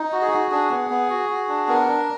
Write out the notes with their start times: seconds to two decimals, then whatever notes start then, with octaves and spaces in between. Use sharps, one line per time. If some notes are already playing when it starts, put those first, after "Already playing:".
Already playing: D#4
0.12 F#4
0.22 G#4
0.32 F#4
0.51 D4 G#4
0.70 B3
0.90 B3
1.10 F#4
1.29 F#4
1.48 D4
1.68 B3 A#4
1.89 D4